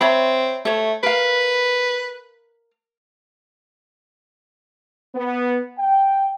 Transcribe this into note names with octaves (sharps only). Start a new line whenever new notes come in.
C4 C#5 E5 B5
A3 C#5 E5
A#4 B4 F5
B3
G5